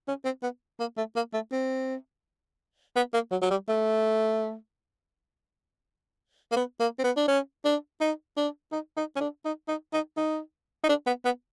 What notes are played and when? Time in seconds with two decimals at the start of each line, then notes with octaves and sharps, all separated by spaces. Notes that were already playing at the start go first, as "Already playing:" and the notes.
0.08 C#4
0.25 C4
0.43 B3
0.80 A#3
0.97 A3
1.16 A#3
1.33 A3
1.52 C4
2.96 B3
3.13 A#3
3.31 F#3
3.41 F#3
3.50 G3
3.68 A3
6.51 A#3
6.56 B3
6.80 A#3
6.99 C4
7.04 B3
7.16 D4
7.28 C#4
7.65 D4
8.00 D#4
8.37 D4
8.72 D#4
8.97 D#4
9.16 C#4
9.20 D4
9.45 D#4
9.68 D#4
9.93 D#4
10.17 D#4
10.83 D#4
10.89 D4
11.06 B3
11.25 B3